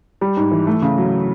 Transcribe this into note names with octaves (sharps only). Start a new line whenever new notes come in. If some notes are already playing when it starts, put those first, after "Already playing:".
G3
G#2
E3
A3
C#3
F#3